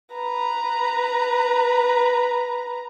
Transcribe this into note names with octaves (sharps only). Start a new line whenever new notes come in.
B4 A#5